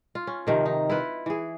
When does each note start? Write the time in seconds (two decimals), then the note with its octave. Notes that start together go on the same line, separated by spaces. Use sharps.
0.15 F4
0.27 C#4
0.47 C3 D#3 F3
0.65 D#4
0.90 E4 F4 B4
1.26 E3 G#4